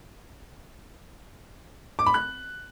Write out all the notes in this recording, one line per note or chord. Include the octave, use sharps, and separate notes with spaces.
D6
B5
F#6